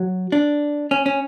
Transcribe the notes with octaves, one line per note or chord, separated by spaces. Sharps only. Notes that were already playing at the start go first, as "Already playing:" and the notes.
Already playing: F#3
D4
C#4
C#4